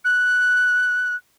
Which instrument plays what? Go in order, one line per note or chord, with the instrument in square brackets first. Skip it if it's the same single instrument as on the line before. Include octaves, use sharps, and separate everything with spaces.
[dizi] F#6